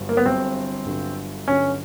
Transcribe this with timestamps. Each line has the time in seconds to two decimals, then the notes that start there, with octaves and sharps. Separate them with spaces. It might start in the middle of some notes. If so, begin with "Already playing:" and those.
Already playing: G1 G2 D3 F#3
0.09 A#3
0.17 B3
0.25 G1 G2 D3 F#3 C4
0.86 G1 G2 D3 F#3
1.48 G1 G2 D3 F#3 C#4